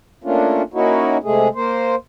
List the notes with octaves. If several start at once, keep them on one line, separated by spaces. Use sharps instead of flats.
A3 A#3 C#4 D4 F4
A#3 C#4 D#4 E4 F#4
C3 G#3 A3 G#4
A#3 C5